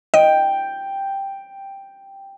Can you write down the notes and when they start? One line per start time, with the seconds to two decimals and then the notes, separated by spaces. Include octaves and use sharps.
0.14 D#5 G5